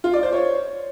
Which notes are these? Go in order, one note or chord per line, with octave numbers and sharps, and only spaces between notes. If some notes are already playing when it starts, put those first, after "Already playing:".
F4
D5
C5
C#5